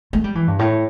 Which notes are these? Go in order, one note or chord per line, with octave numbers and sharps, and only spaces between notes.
A3
G3
E3
G2
A2